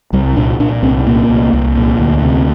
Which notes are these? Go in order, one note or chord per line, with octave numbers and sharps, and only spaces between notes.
C2 G3
A#2 D4
A#2 D4
C2 C4
A#2 A#3
C2
C2
A#2
D2
C3